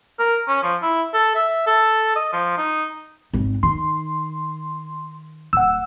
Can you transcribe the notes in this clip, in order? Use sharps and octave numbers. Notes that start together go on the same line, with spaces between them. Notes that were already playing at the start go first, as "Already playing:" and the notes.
A#4
C#4
F3
E4
A4
E5
A4
D#5
F3
D#4
G#1 C4
D#3 C6
D1 F#5 E6